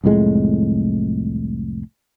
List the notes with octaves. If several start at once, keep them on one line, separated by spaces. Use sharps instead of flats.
C2 F2 A2 G#3